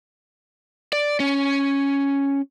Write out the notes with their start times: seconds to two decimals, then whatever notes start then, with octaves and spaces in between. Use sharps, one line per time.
0.93 D5
1.20 C#4